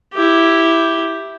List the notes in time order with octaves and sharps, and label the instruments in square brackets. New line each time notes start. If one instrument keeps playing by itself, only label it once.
[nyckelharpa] E4 G4